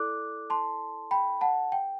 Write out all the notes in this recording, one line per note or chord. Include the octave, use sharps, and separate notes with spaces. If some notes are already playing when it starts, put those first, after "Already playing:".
Already playing: E4 A4 D5 D6 F#6
A5 C6
G5 B5
F#5 A5
G5